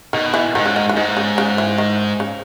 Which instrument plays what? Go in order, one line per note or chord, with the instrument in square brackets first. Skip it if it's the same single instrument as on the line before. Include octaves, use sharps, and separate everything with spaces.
[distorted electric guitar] B2 [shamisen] D#3
[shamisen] E3
[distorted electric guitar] G#2 [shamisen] D#3
[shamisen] C#3
D#3
E3
[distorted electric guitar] G#2 [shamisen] D#3
[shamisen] C#3
C#3
E3
D#3
C#3